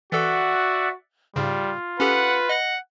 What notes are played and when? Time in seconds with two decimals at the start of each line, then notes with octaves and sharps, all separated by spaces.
0.12 E3 F#4 A4 D5 E5 F#5
1.36 G#2 C#3 G3 F4
2.00 C#4 G4 A4 B4 F#5
2.49 D#5 F#5 A#6